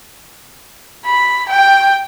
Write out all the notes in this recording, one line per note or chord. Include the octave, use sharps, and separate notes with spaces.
B5
G5